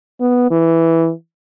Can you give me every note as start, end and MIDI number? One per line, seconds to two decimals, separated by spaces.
0.21 0.46 59
0.51 1.11 52